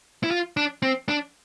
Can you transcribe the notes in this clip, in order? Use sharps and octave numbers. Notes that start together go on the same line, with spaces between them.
E4
F4
D4
C4
D4